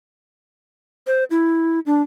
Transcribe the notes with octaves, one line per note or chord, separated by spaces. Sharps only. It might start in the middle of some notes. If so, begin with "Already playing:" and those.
C5
E4
D4